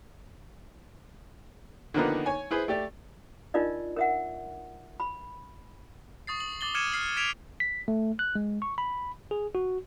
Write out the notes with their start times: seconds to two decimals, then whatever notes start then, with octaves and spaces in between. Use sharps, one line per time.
1.94 D3 D#3 F3 A#3 B3 D#4
2.26 C#5 G#5
2.51 E4 G#4 B4 C5
2.68 A3 G4 D5
3.54 D4 D#4 F4 A#4 D5 D#5
3.96 A#4 E5 F#5
5.00 B5
6.27 C#6 D#6 A6 C7
6.40 F#7
6.61 D6 A6 F#7 G7
6.74 D6 F6 G#6 C#7 D#7 E7
6.92 F6 C7 F#7
7.17 G#6 B6 D7 E7 F7
7.60 B6
7.88 A3
8.19 F#6
8.35 G#3
8.62 C#6
8.78 B5
9.31 G#4
9.55 F#4